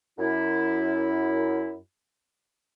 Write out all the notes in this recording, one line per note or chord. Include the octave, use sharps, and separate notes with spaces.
F#2 E4